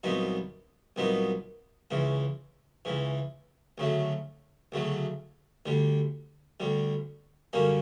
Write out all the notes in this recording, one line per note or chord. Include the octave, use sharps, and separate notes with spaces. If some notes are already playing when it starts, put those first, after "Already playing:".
C2 A#2 F#3 B3 D#4
C2 A#2 F#3 B3 D#4
C#2 C#3 E3
C#2 C#3 E3
D2 C#3 F#3 A3
D2 C#3 F#3 A3
D2 D3 G3
D2 D3 G3
F#2 D3 G3 A#3 C#4